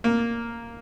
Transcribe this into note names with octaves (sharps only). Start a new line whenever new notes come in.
A#3